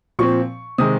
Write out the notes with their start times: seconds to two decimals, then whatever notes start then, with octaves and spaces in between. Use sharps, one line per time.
0.19 A#2 F3 C4 C#6
0.78 C3 D#3 G#3 D#6